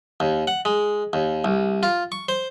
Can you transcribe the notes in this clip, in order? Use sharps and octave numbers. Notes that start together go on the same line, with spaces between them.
D#2
F#5
G#3
D#2
C2
F4
C#6
C5